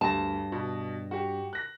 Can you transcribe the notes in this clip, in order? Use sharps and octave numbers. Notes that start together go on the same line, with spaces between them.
D2 G2 A5 A#6
B2
F#4 G4
F#6 A#6